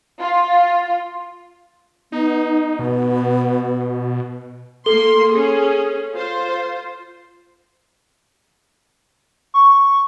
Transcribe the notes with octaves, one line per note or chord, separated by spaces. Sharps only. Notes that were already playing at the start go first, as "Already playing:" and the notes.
F4
B3 D#4
B2 B3
A#3 A4 C6 G7
C#4 G#4
F4 C5
C#6